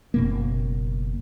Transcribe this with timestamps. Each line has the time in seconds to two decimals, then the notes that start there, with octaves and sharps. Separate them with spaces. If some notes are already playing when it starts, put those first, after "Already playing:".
0.14 F#1 B2 A#3